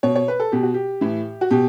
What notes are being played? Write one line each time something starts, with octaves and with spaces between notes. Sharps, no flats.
B2 C#5
C#5
B4
A4
B2 G4
F#4
G4
A2 E3
F#4
B2 G4